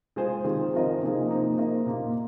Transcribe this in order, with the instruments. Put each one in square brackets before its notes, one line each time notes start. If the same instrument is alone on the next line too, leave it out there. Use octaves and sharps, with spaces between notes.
[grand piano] G#3 F4 G#4 C5
D#3 C4 F4 G#4
F3 C4 F4 A#4 D#5
C3 F3 A#3 D#4 G#4
A#3 D#4 C5
A#3 D#4 A#4 D#5
A#2 A#3 F4